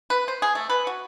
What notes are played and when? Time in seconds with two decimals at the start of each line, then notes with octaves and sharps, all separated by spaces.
0.10 B4
0.28 C5
0.42 G#4
0.55 A3
0.70 B4
0.87 F#4